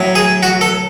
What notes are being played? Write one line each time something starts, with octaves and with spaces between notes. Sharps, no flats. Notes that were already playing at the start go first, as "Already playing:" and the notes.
Already playing: A2 F#3
G#4
F#4
A4